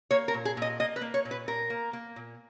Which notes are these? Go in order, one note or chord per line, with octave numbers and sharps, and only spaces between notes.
A#3 C#5
A#4
A#2
G#4
A#2 D#5
A#3 D#5
B4
A#3
C#5
A#2
B4
A#2 A#4
A#3
A#3
A#2